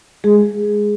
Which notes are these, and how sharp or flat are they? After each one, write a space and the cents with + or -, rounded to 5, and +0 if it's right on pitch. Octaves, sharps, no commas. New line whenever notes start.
G#3 +0 G#4 +0